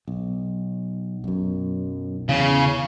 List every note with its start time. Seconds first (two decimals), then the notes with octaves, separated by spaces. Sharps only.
0.08 B1
1.24 B1 F#2
2.29 E2 C#3